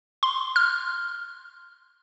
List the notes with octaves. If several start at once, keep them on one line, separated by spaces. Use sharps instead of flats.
C6
F6